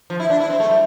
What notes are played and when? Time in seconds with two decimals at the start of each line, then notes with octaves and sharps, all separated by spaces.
0.10 F3
0.20 E4
0.30 D4
0.40 E4
0.50 C4
0.60 A3
0.70 G3